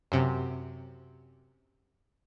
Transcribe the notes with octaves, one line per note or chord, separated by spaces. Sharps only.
F#2 C3